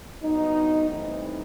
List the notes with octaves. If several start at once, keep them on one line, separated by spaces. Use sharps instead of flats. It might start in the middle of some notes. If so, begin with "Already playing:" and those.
G2 F#3 B3 D#4
G2 E3 A3 C4 D#4